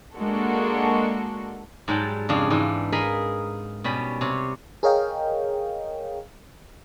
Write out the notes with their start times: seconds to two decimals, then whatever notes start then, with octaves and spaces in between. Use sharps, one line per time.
0.16 G#3 A#3 D4 F#4 A4
1.88 G#2 F#3 G3 G5 A5
2.29 F2 C#3 D4 F5
2.50 G#2 E3 D4
2.92 G#4 A#4 D#5 F5 B5
3.84 B2 G3 C#4 B5
4.21 C3 C#5
4.83 G#4 A#4 C#5 D#5 F5 G5